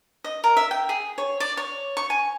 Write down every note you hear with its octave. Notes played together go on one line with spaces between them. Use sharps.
D#5
A#4
E5
G5
G#4
C#5
D5
C#5
C#6
G#5